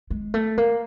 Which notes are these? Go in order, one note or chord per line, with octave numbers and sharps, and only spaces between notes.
G#3
A3
A#3